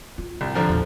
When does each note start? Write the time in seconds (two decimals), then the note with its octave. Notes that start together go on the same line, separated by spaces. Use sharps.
0.18 F4
0.41 C2
0.54 D3 F3 A#5
0.69 A#1 E2